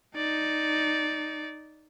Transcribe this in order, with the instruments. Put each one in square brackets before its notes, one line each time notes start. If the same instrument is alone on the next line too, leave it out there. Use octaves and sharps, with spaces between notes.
[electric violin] D#4 D5